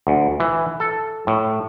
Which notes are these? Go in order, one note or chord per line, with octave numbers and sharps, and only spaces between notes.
D2
E3
A4
A2